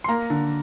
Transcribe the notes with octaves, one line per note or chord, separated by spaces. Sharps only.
C6
A#3 A#5
D3